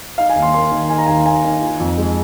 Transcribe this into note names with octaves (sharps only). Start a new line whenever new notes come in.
D#4 F5
G#5
D#2
C6
A#3 C6
D#3
D#4 G#5
A#5
D#2 G#5
A#3 G#5
D#3
F4
F2
G#3